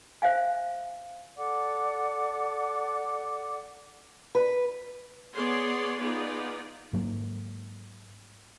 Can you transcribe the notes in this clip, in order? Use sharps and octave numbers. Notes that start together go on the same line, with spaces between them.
C5 E5 F5 G#5
A4 D5 F#5 D6
B4
B3 G#4 C#5 D5 C6
B3 D#4 F4 G#4 B4 D5
G#2 F#3 A#3